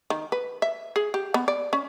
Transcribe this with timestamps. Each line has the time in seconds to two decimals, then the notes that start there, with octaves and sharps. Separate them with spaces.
0.10 D#3
0.32 B4
0.62 E5
0.96 G#4
1.14 G4
1.34 B3
1.48 D5
1.73 C#4